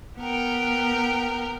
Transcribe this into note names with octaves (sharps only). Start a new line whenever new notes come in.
B3 A#4 G5